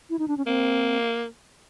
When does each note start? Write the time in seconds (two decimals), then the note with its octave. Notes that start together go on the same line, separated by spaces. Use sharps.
0.10 E4
0.19 D#4
0.28 D4
0.37 C#4
0.46 A#3 C4